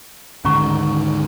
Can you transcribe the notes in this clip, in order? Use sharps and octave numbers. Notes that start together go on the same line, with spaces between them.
D2 G#2 D#3 C#4 A#5 C#6